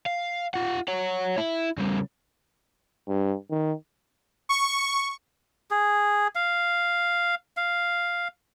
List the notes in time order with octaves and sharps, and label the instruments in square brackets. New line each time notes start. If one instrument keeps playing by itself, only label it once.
[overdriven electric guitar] F5
F4 F#5
C#5 F#5
E4
C#3 G3
[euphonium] G2
D#3
[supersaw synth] C#6
[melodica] G#4
F5
F5